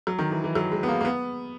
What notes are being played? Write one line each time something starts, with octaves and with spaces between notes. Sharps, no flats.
F#3
D#3
E3
E3
F#3
G#3
B3
A#3
A#3
B3